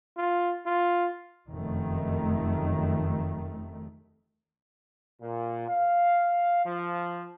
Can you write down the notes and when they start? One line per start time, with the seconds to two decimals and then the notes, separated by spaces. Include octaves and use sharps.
0.17 F4
0.66 F4
1.50 F1 F#2 D#3 A3
5.22 A#2
5.69 F5
6.66 F3